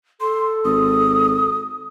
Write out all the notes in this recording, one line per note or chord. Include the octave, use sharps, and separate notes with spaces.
A4 C6
G#1 D#6